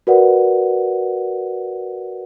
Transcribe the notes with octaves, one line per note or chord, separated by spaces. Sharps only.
F#4 A#4 B4 D5 F#5